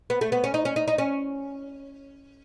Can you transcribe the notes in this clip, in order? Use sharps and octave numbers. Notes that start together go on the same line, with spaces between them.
B3
A3
B3
C#4
D#4
C#4
D#4
D#4
C#4